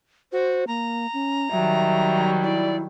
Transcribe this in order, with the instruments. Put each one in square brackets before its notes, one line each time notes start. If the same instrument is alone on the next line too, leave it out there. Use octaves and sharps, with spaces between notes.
[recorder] F#4 [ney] C5
[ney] A#3 [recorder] A#5
[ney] C#4
[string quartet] D#3 F#3 G3 [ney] E5
[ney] E4 [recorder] D5